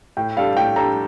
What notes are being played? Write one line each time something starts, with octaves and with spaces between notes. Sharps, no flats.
A2 G5
G3 D4 A4 F5
A2 G5
G3 D4 A4 A#5